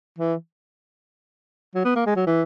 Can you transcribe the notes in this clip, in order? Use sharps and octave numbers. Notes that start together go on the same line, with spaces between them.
E3
F#3
B3
A#3
G#3
F#3
E3